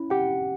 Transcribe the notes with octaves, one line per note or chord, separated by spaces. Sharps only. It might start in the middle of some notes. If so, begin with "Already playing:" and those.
Already playing: C#4 E4
G4 F#5